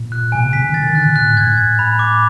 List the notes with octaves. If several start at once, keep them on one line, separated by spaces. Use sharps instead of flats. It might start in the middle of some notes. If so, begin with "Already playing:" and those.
Already playing: A#2
F#6
B2 G#5
C3
C#3 B6
D3
D#3 A6
D3
F#6
A#2
F#6
A2
G#2
G#6
A2
G#6
B5
D6